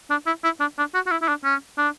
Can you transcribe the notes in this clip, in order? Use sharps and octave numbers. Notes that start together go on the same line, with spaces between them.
D4
E4
E4
D4
D4
F#4
F#4
E4
E4
D4
C#4
D4